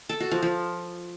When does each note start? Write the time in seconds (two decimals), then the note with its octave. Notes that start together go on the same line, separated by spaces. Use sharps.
0.09 A4
0.20 F#4
0.32 F3
0.43 F3